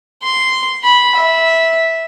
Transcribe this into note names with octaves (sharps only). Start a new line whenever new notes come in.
C6
B5
E5